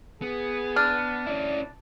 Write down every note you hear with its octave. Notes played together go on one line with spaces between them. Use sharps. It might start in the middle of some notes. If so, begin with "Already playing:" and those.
B3 G#4
D4 F6
C#4 E4 D5